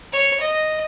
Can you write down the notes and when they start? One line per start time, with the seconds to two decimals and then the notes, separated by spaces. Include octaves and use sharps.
0.13 C#5
0.41 D#5